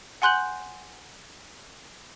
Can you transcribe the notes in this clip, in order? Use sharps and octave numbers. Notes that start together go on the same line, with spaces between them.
F#5 G#5 C6 F#6 G6 F#7